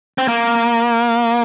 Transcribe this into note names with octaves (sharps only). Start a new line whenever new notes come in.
C4
A#3